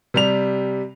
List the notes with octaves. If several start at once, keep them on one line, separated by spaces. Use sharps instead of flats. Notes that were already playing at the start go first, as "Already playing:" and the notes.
C3 G3 F7